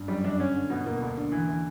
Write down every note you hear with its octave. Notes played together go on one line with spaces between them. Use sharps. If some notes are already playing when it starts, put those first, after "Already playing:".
Already playing: G2
F#2 G3
F#2 D4
D3 C#4
D3
B2 B3
B2 A#3
D2
D3
E3
E3